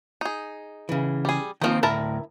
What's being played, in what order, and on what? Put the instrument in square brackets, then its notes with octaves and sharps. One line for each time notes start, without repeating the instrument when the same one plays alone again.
[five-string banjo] D#4 G#4
[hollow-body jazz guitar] C#3 E3
[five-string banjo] G3 G#4
[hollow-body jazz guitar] D#3 A#3 C4 [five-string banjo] F3 D#4
[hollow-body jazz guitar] D2 A2 A#4 [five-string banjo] E4 A5 A#5